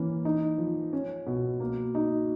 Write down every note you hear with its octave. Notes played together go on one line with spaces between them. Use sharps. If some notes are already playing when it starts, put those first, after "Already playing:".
Already playing: E3 A#3 C#4
D#4
F3
C#4
B2
A#3
D#4